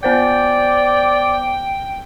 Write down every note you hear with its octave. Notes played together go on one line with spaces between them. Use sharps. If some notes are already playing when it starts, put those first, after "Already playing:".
B3 C5 D5 G5 G6